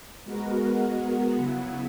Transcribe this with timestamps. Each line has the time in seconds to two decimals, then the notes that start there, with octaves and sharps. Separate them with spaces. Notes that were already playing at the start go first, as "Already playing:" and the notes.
0.25 G#3 B3 F#4 A#4
1.36 C#3 F#3 B3 E4